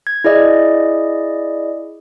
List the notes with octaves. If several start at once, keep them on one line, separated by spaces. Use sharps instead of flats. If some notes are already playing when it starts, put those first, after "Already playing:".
G#6
E4 G#4 D5 D#5